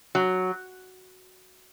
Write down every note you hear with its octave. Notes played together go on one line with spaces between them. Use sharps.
F#3